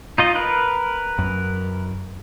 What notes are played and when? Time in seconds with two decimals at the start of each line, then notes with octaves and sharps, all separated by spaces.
0.18 D#4 F4 D#5
0.35 A#4 B4
1.19 F#2